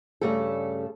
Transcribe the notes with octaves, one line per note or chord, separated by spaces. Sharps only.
G2 C#3 G3 A3 A4